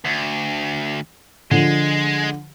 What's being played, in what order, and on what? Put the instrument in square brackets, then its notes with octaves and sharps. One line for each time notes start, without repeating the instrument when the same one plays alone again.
[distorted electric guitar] D2
[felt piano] D3 F3 [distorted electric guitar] G#3